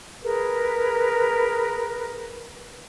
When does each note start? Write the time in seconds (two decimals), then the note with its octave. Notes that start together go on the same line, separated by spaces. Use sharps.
0.23 G#4 A#4 B4